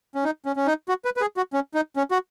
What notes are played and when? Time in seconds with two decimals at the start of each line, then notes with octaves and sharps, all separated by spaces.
0.15 C#4
0.24 D#4
0.46 C#4
0.56 C#4
0.67 D#4
0.89 F#4
1.05 B4
1.17 B4
1.21 G#4
1.37 F#4
1.53 C#4
1.74 D#4
1.96 C#4
2.11 F#4